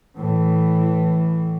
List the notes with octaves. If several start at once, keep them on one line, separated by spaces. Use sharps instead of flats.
A2 E3